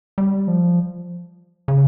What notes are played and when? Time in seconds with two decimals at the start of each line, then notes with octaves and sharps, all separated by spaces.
0.18 G3
0.48 F3
1.68 C#3